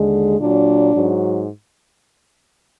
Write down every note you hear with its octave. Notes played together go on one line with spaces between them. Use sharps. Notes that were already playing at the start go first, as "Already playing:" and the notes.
Already playing: D#2 D3 G#3
A#2 F#3 D4
G#2 F#3